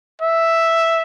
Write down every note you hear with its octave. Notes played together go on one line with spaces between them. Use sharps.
E5